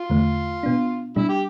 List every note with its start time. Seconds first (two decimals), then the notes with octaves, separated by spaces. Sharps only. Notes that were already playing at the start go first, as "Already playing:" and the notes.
Already playing: F4
0.10 E2 D3 A3
0.63 B2 B3 D4
1.16 B2 G3 D4 E4
1.29 G4